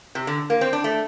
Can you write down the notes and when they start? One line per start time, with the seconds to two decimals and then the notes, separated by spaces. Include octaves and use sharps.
0.15 C3
0.27 D3
0.50 A#3
0.61 C4
0.73 D4
0.84 A3